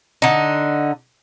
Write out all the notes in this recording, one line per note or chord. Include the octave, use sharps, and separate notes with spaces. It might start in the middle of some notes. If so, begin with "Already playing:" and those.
D3 D#4